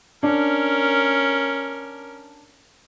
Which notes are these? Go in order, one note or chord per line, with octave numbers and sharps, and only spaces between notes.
C#4 D4 A#4